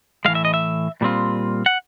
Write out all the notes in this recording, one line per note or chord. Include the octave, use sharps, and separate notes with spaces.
A2 E3 G#3 F5
E5
D#5
E5
A#2 G3 C4 F4
F#5